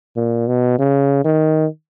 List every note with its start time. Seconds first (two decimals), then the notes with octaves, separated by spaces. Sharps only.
0.16 A#2
0.48 B2
0.79 C#3
1.24 D#3